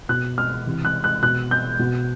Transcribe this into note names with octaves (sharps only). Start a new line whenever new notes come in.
B2 F#6
F6
C3 E3
F#6
F#6
B2 F#6
G6
B2